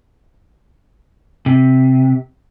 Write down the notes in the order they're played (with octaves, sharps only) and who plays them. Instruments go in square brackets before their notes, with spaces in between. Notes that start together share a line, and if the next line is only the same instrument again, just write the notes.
[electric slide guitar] C3